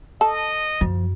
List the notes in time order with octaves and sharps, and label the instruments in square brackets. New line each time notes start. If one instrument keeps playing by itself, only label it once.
[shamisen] A4 [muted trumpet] D#5
[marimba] F#2 [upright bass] F3